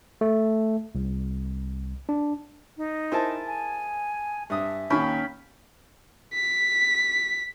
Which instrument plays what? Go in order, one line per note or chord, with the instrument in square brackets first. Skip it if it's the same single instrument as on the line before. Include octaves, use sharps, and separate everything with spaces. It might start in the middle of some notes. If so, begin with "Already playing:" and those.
[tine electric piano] A3
C2
D4
[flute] D#4
[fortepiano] E4 A#4 C5 [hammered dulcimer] G#4 A5
[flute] G#5
[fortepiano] G2 D#6 [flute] E5
[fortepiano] D#2 A#2 D#3 [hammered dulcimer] C#4 G5 B5
[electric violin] B6